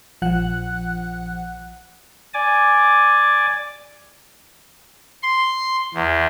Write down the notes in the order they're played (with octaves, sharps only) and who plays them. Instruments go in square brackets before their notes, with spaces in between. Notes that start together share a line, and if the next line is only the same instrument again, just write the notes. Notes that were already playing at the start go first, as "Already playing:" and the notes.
[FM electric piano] A#1 F3 F#5 F#6
[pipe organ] D5 G#5 D6
C6
E2